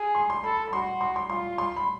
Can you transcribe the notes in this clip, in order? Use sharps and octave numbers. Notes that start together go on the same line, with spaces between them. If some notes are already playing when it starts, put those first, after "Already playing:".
Already playing: G#4
C6
C6
A4 B5
B5
F#4 C6
C6
C6
F4 C6
C6
B5